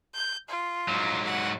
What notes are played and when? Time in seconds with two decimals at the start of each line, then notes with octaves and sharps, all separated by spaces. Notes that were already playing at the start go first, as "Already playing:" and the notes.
0.15 G6
0.49 F4
0.88 G#2 F#3
1.26 F#5